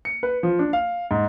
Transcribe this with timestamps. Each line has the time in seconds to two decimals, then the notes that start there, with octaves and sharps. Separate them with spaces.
0.05 C#7
0.23 B4
0.43 F3
0.59 D4
0.73 F5
1.11 G#2